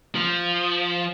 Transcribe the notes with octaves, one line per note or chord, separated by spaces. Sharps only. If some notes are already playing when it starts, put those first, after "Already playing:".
F3